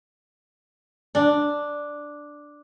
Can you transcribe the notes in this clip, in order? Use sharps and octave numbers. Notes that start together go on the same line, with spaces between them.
D4